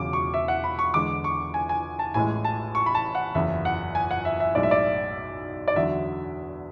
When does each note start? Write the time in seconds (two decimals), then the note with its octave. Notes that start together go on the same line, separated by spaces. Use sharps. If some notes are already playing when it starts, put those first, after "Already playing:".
Already playing: E1 E2 C#3 F#3 D6
0.13 C#6
0.34 E5
0.48 F#5
0.64 B5
0.79 C#6
0.94 E2 D3 G#3 D6
1.24 C#6
1.54 G#5
1.69 G#5
1.99 A5
2.14 A1 A2 G#3 G#5
2.45 A5
2.75 C#6
2.86 B5
2.95 A5
3.15 F#5
3.34 F#1 E2 C#3 E5
3.65 F#5
3.95 G#5
4.11 F#5
4.25 E5
4.40 E5
4.55 B1 A2 G#3 D5
4.63 E5
4.71 D5
5.68 D5
5.76 E2 D3 F#3 E5